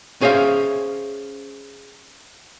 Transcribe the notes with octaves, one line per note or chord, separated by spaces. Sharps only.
C#4 G#4 C5 E5 F5